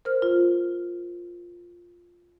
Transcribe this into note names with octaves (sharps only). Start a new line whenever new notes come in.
A#4 C5 F6
F4